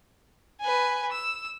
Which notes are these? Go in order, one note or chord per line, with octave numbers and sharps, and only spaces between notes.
B4 G#5
E6